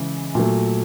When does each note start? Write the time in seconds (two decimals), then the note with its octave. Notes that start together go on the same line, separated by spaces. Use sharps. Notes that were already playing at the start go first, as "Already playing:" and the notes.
Already playing: C#3 E3 G#3
0.35 A#2 F#3 A3